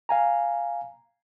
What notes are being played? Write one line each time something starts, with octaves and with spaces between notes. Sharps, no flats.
F5 G#5 A#5